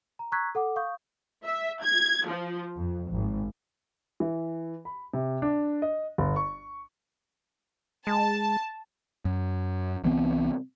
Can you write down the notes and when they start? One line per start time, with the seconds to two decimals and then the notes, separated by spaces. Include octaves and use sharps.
0.19 A#5
0.32 A#5 C#6 E6 F#6 G#6 B6
0.55 A4 F#5 D6
0.76 F5 C#6 D#6 G6
1.45 E5
1.82 G#6
2.28 F3
2.77 F2
3.11 G#1
4.20 E3
4.85 B5
5.13 C3
5.42 D4
5.82 D#5
6.18 G1
6.36 C#6
8.07 G#3 A5
9.25 F#2
10.04 C2 E3 B3 C4